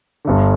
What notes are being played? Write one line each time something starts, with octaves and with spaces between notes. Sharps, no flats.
G1 G2 D3